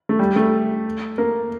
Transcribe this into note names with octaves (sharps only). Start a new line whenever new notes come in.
A3
G3
A3
A#3